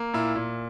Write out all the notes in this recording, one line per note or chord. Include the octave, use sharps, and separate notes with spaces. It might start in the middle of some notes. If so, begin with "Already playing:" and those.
Already playing: A#3
A#2 E4
A#2